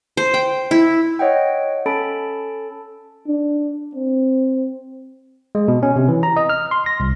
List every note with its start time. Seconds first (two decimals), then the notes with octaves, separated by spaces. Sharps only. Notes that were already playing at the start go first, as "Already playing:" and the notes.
0.17 C5
0.34 G5
0.71 E4
1.19 C#5 D#5 F#5 G5
1.86 C#4 A4 A5 B5 A6 D7
3.27 D4
3.95 C4
5.55 G#3
5.68 B2
5.83 C#4
5.96 C3
6.08 E3
6.23 A#5
6.36 D#5
6.49 F6
6.71 C6
6.86 A#6
7.00 C2